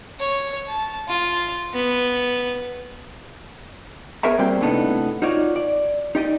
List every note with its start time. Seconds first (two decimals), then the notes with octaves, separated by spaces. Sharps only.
0.20 C#5
0.67 A5
1.08 F4
1.74 B3
4.23 B3 G#4 A#4 C#5 E5 A#5
4.39 G3 A#3 C4 F#4 G5
4.61 A2 C3 B3 D4 D#4 A4
5.22 D#4 F4 F#4 C#5 D5
5.56 D5
6.15 D#4 G4 D5 D#5